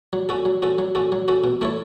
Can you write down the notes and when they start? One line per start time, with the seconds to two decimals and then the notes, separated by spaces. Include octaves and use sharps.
0.13 F#3
0.29 C#4 F#4 A4
0.45 F#3
0.62 C#4 F#4 A4
0.78 F#3
0.95 C#4 F#4 A4
1.12 F#3
1.28 C#4 F#4 A4
1.44 B2
1.61 A3 E4 A4 C#5